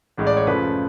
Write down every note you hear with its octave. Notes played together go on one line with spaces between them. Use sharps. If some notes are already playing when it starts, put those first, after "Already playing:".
A1 A2 G#3
D5
C#5
F#2 C#3 F3 A3 B4